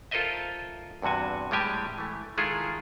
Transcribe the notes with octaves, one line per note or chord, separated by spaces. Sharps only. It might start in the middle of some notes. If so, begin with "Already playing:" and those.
F4 A4 A#4 C5 D#5 E5
E2 G2 C3 F#4 G#5
A2 G3 G#3 G4 G#5
E3 A3
D#3 G#3 E4 F4 G#4 A4